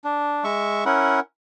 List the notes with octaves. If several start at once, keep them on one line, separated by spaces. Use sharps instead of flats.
D4
G#3 E5 C#6
C#4 E4 A#4 F#5